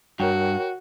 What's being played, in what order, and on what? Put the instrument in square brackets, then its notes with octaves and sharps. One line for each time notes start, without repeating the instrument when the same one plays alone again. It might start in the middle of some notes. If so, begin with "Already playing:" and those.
[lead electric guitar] G2 [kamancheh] F#4 [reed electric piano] A#4 C#5 G5